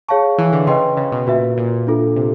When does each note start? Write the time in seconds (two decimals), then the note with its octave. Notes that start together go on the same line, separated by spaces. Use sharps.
0.08 G#4 C#5 F5 A5 C#6
0.38 E3
0.53 D3
0.67 C#3 B4 D#5 G5 C6
0.97 C#3
1.12 B2
1.27 A#2 F#4 B4 E5
1.57 A#2
1.87 D4 F4 A4
2.16 C3